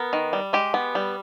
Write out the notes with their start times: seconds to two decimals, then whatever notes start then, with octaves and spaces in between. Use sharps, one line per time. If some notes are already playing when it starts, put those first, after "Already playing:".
Already playing: B3 A#4
0.13 D#3
0.33 G3
0.53 G#3 G4
0.74 B3
0.95 G3